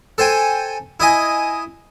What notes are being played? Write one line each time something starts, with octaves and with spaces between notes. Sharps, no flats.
A4 C5 G5 G#5
E4 D#5 G#5